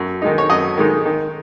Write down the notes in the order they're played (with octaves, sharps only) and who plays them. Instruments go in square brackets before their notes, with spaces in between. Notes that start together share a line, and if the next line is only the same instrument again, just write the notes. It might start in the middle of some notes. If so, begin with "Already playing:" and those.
Already playing: [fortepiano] F#2
D#3 G#3 D#4
C#5
F#2 D#5
D#3 G#3 D#4
D#3